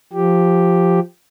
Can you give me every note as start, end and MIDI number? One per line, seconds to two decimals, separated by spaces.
0.13 1.00 53
0.13 1.00 67